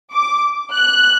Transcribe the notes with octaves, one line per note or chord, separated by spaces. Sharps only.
D6
F#6